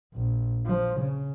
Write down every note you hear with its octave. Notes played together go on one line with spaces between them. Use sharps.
A#1
F3
C#3